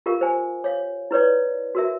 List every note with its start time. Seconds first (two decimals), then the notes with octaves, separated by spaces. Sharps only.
0.06 F4 G4 A#4 F5
0.21 C5 G#5
0.64 C#5 F5
1.11 E4 B4 C#5 D5
1.75 F#4 A#4 E5